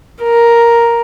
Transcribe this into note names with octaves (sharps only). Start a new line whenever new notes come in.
A#4